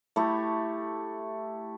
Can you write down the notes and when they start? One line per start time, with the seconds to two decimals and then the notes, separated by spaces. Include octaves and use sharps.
0.16 A3 E4 G4